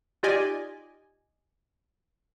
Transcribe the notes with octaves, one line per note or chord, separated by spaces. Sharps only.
D#4 F4 G4 D5 D#5 G#5